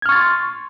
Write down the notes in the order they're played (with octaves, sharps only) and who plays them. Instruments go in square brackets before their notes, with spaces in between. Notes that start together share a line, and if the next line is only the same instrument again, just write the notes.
[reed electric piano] G#6
F6
C#6
A6
C6